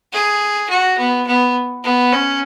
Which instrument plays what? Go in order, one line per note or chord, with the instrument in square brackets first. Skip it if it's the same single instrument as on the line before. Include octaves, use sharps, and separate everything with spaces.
[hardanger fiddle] G#4
F#4
B3
B3
B3
C#4